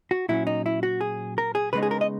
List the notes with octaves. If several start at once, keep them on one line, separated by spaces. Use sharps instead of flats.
F#4
A#2 F#3 C#4 E4
D#4
E4
F#4
G#4
A#4
G#4
C#3 G#3 B3 D#4 B4
G#4
A#4
D#5